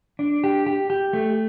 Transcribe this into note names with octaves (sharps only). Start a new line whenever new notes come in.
D4
G4
G4
G4
A3